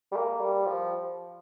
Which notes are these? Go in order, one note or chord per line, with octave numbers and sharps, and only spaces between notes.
G3
A#3
G3
F3